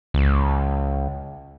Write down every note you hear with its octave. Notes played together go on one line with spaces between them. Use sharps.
C#2